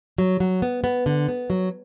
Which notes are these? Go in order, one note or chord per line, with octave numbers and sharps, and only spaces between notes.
F#3
F#3
B3
B3
D3
B3
F#3